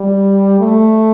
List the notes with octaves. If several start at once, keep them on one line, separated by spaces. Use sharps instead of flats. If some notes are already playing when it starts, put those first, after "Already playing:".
Already playing: G3
A3